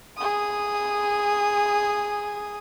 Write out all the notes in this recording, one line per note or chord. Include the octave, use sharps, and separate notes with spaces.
G#4 D#6